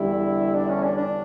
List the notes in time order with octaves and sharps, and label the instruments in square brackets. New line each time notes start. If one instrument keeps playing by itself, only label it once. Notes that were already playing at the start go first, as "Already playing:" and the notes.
Already playing: [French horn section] E2 D3 G3 [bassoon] E4
[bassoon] D4
C#4
D4
D4